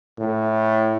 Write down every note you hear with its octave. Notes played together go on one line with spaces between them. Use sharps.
A2